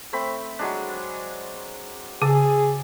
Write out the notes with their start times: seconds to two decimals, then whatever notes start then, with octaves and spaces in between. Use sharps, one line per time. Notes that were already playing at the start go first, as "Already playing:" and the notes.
0.13 A3 C4 B5
0.59 F#3 G#3 D4
2.22 C#3 G#4 A5 D6 E6